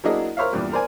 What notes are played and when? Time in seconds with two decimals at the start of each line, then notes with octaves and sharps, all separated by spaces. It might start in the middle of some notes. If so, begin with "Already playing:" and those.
0.04 F#3 A#3 D4 E4 G#4 D#5
0.37 A#4 C5 C#5 E5 F5
0.53 E2 G2 A#2
0.72 A#4 C5 D5 G#5